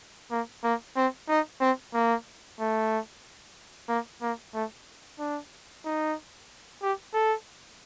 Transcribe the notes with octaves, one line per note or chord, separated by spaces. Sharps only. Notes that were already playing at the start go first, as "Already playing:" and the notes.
A#3
A#3
C4
D#4
C4
A#3
A3
A#3
A#3
A3
D4
D#4
G4
A4